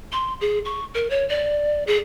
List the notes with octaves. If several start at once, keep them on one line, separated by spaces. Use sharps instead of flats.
C6
G#4
C#6
A#4
C#5
D5
G#4